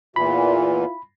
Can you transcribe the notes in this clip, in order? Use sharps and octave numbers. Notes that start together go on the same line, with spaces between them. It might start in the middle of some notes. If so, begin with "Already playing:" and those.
E2 A#2 E3 E4 F4 B5